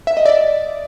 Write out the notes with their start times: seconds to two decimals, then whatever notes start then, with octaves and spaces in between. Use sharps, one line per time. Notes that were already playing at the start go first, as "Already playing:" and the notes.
0.07 E5
0.17 D#5
0.26 D5 E5